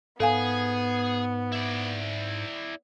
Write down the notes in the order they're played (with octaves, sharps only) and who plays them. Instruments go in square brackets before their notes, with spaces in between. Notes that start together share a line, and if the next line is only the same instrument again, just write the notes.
[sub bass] G#2 [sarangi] B3 [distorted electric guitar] G#4 [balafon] A4 F5 G#5
[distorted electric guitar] E4 D5